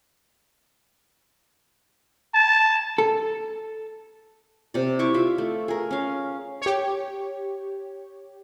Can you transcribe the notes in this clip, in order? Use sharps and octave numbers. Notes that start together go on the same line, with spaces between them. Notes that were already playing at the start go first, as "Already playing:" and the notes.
A5
A4
C3 D5
E4 C#6 D6
F4 E5
A3
G#4 A#4
C#4 F5
G4 C#5